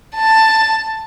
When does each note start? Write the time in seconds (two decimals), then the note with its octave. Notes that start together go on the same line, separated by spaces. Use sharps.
0.16 A5